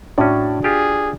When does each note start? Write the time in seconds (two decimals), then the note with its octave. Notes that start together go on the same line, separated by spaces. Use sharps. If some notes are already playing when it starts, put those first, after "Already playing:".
0.18 A2 C#4 D4 F#4 D5
0.64 F4 G4 G#4